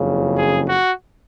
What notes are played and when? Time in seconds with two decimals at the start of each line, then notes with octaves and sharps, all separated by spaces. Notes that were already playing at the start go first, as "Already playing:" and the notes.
Already playing: F#1 F2 C#3
0.38 G#4
0.68 F#4